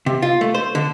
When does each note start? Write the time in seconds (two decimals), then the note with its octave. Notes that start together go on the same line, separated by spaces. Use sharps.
0.06 C3
0.22 F4
0.41 A3
0.54 C5
0.75 D3